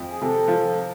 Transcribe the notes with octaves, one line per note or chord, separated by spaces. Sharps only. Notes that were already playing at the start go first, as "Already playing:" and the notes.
Already playing: F2 F3
G#4
C3 A4
F3